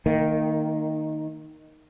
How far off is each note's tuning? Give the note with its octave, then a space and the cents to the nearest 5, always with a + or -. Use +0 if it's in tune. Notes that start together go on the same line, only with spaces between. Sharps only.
D#3 +0 A#3 -30